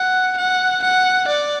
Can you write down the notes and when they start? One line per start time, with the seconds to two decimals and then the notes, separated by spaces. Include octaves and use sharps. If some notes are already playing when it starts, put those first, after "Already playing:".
Already playing: F#5
0.37 F#5
0.83 F#5
1.28 D5